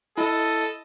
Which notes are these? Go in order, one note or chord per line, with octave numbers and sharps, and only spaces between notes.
E4 A4 D#5